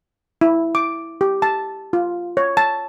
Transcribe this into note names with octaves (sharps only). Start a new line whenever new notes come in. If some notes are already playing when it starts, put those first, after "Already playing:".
E4
D6
G4
A5
F4
C#5
A5